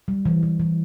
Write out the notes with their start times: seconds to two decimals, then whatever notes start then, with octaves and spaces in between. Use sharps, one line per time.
0.08 G3
0.26 E3
0.43 E3
0.60 E3